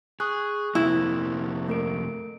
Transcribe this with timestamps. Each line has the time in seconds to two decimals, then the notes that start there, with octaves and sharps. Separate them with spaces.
0.20 G#4 C#6 D#6 F#6
0.75 F2 C3 A#3 E4
1.68 A3 A#4 D7